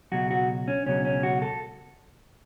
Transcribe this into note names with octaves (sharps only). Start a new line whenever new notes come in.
C#2 B2 F#3 F#4
F#4
C#4
C#2 B2 F#3 C#4
C#4
F#4
A4